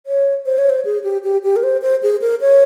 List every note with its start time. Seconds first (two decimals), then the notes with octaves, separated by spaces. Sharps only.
0.06 C#5
0.46 C5
0.58 C#5
0.69 C5
0.85 G#4
1.04 G4
1.24 G4
1.44 G4
1.56 A#4
1.63 C5
1.82 C5
2.03 G#4
2.21 A#4
2.41 C#5